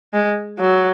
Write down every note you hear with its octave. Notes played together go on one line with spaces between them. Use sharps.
G#3
F#3